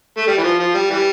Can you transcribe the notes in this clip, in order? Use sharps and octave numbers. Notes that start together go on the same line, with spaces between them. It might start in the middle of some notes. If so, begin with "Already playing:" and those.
A3
G3
E3
F3
F3
G3
E3 G3